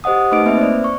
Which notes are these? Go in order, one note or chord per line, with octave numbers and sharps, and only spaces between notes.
G4 C5 D#5 F#5 D#6
A3 D#4 B4 D#5 D7
A#3 C4 B4 E5
C5 D5
C#6